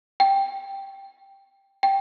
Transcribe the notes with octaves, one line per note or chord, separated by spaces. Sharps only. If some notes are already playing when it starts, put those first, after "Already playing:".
G5
G5